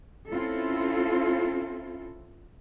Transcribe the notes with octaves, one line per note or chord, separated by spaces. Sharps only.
C4 C#4 E4 F4 A4